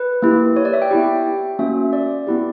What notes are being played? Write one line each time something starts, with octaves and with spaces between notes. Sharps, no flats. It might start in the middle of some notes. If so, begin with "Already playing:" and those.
Already playing: B4
A#3 E4 G4
C#5
D5
E5
G5
B3 E4 G4
A#3 C#4 F#4 E5
D5
B3 E4 G4